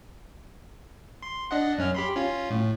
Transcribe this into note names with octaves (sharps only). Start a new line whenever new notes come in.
C6
D4 D#5 F#5
F#2 C#4 F6
G4 B5 C6
C#4 F4
A2